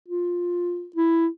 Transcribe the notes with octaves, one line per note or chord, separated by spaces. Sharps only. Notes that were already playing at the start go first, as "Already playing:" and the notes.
F4
E4